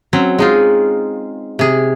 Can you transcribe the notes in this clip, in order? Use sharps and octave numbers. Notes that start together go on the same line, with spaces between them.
F#3 C4 C#4
G#3 D#4 F4
C3 G#4